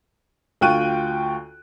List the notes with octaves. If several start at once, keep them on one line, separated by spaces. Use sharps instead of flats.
D2 F4 G5 C#6 F#6 D#7